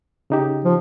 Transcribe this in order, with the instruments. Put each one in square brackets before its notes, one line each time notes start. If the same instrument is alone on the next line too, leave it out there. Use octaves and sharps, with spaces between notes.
[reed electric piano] C#3 D#4 G4
[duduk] F3